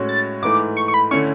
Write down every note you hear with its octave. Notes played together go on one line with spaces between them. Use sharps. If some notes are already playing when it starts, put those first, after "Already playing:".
Already playing: A2 G#3 C#4 F#4 C#5
A6
G#2 E3 A3 D6
C#6
C#6
B5
D3 A3 C#4 E4 C#6